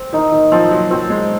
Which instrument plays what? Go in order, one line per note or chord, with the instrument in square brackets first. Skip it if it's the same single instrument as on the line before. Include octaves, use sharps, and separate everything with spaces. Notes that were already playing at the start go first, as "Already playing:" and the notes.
Already playing: [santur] C4
[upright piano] D#3 [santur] D#4
[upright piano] D#3
[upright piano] F3 [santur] C4
[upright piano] F#3
[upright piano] F#3 [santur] C4
[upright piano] G#3